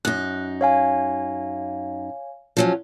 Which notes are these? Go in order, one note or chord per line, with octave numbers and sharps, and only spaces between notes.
F#2 D#4 F#6
C#5 F5 G#5
F3 F#3 C#4